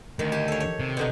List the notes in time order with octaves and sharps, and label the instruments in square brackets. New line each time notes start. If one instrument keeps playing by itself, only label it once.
[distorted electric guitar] D2 [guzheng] D#3
[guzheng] G4 G#5 A5
A4 C#5
C#5
[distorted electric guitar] C3
[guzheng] B2 D3 D#4